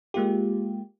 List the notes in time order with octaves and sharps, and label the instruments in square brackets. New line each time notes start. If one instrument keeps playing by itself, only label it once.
[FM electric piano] G#3 A#3 F4 G4